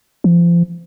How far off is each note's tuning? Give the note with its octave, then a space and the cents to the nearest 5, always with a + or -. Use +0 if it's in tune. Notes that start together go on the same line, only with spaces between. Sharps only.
F3 -30